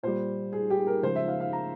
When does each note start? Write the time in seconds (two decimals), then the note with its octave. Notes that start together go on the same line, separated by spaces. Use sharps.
0.03 A#2 G3 C5
0.53 G#4
0.70 G4
0.87 A#4
1.03 C#3 F3 G#3 C5
1.16 E5
1.28 F5
1.40 F5
1.53 A#5